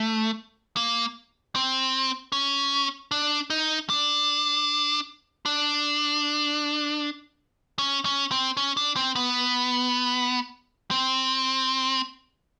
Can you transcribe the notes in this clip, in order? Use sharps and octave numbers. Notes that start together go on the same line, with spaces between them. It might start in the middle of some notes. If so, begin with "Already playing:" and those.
Already playing: A3
A#3
C4
C#4
D4
D#4
D4
D4
C#4
C#4
C4
C#4
D4
C4
B3
C4